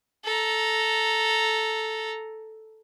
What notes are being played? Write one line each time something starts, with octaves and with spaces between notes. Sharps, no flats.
A4 A#5